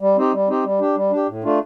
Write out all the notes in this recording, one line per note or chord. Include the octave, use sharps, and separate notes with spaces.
G3
C4 D#4 G4
G3
C4 D#4 G4
G3
D4 G4
G3
D4 G4
A2
A3 D4 F4